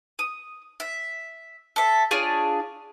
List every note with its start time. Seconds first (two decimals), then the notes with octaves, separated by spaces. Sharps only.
0.19 D#6
0.80 E5
1.76 A4 E5
2.11 D4 F4 G#4 C#5